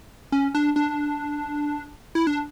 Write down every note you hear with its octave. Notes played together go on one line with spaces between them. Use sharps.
C#4
D4
D4
E4
D4